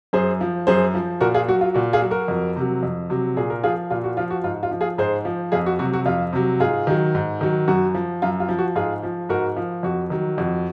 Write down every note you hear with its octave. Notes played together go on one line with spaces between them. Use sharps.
F#2 G#4 C5
F3
F#2 G#4 C5
F3
A#2 F#4 A#4
F4 G#4
F#3 F#4
F4
A#2 F#4
F4 G#4
F#3
F#4 A#4
F2
C3 F#3
F2
C3 F#3
A#2 G#4
A#4
F3 F4 G#4
A#2 F4
F#4
F3 F4
F#4
G#2 F4
F4
F3
F4 G#4
G#2 G#4 C5
F3
F2 F4 G#4
F#4
C3 F#3 F#4
F#4
F2 F4
C3 F#3
G#2 F4 G#4
D#3 F#3
G#2
D#3 F#3
F#2 F#4
F3
F#2 F4
F4
F3
F#4
G#2 F4 G#4
F3
G#2 F#4 A#4
F3
F2 F#4
D#3 F#3
F2 F#4